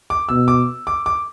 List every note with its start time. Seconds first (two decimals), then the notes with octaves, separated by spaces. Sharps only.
0.10 D6
0.29 B2 E6
0.48 D6
0.87 D6
1.06 D6